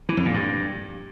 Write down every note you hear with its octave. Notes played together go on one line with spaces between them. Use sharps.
E3
F2
A#2
G2